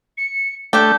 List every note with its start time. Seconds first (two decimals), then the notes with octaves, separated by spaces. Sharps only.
0.17 C#7
0.73 A3 D4 G4 G6